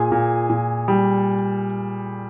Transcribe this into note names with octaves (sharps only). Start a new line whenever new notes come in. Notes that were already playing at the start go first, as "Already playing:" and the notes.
Already playing: A#2 G#4 G#5
A#2
A#2
G3